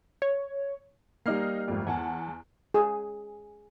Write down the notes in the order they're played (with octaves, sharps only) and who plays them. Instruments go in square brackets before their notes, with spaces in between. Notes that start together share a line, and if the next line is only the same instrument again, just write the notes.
[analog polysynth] C#5
[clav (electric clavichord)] G3 A#3 [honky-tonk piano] D#4 F6 C7
[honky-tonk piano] G#1 F2
[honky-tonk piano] E2 F#5 A5 [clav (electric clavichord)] G#5
[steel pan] G#4